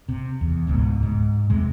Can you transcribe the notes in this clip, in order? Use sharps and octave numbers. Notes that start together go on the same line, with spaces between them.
C3
E2
E1 C#2 G#2 B2
G#2
E2 C3 G#3